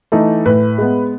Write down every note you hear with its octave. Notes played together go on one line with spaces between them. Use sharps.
E3 A3 D#4
A2 B4
G#3 B3